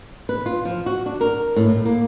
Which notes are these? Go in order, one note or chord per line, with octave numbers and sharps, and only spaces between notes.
B4
F4
F3
F#4
D4
A#4
A2
A2
A#3